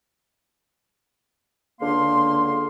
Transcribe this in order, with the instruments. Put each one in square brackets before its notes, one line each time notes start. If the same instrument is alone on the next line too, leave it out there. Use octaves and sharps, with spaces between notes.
[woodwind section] C#2 D3 A#3 F5 C6